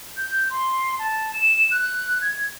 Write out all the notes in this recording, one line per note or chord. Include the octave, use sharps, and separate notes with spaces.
G6
C6
A5
E7
F#6
G#6